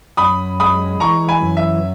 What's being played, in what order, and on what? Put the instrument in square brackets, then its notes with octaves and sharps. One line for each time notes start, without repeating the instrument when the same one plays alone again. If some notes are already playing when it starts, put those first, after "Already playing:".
[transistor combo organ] F#2 [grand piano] B5 D#6
[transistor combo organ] G#3 [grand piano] B5 D#6
[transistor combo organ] E3 [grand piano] A#5 C#6
[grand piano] G#5 B5
[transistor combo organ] F#2
[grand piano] E5